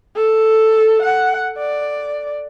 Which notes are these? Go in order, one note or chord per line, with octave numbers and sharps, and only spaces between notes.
A4
F#5
D5